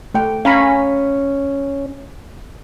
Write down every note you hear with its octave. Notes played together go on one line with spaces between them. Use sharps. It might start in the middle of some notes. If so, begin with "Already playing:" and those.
A3 G5
C#4 F5 A#5 B5